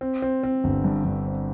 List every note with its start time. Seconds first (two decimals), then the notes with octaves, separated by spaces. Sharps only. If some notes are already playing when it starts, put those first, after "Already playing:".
0.01 C4
0.22 C4
0.43 C4
0.64 G1
0.84 G2
1.05 G2
1.26 C4